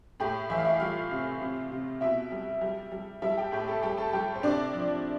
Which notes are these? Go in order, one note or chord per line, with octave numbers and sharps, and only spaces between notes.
A2 G4
E3 E5
F5
E4 E5
G3 F4 F5
C3
C3
C3
B2 E4 E5
G3
G3
G3
G3 E4 E5
G4 G5
A2 G4 G5
A4 A5
G3 G4 G5
A4 A5
A5
G3 G4 G5
C5
C3 D4 D5
F3